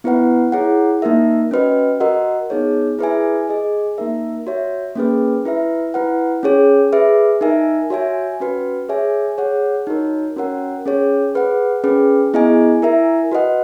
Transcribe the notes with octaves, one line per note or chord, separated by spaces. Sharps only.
B3 E4 B4 F#5
E4 G#4 C#5 F#5
A#3 D#4 A#4 E5
C#4 F#4 B4 D#5
F#4 A#4 D#5 F#5
B3 D#4 G#4 C#5
E4 G#4 B4 E5 G#5
G#4 D#5 G#5
A#3 D#4 A#4 E5
F#4 C#5 E5
A#3 C#4 G#4 B4
E4 B4 E5
E4 B4 F#5
C#4 G#4 C#5
G#4 B4 E5
D#4 A#4 E5 G#5
F#4 C#5 E5 G#5
C#4 F#4 B4
G#4 C#5 E5 G#5
G#4 C#5 F#5
D#4 F#4 A#4 C#5
C#4 F#4 A#4 C#5 F#5
C#4 G#4 C#5
G#4 B4 F#5
C#4 G#4 B4
B3 E4 G#4 D#5 G#5
E4 A#4 E5 G#5
F#4 B4 D#5 F#5